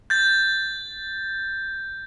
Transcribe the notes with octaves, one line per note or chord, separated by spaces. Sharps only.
G6 A6